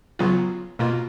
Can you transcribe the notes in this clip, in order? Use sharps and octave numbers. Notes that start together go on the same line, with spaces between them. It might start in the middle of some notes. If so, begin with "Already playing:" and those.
C#3 F#3 B3 F4
B2 A#3 F4